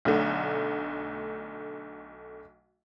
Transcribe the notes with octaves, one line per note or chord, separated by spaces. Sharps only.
B1 D3 A3